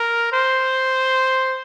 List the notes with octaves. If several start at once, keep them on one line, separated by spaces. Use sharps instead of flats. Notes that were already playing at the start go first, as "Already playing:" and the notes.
Already playing: A#4
C5